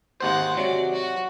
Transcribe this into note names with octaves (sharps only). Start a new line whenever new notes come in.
G#1 D#2 G#3 C5 F#5
C3 F#3 D5
F#4